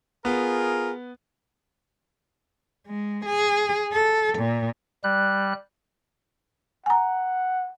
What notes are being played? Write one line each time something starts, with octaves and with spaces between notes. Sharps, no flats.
B3 F4 G#4 A#4
G#3
G#4
A4
A#2
G3 F#6
F#5 G#5 A#5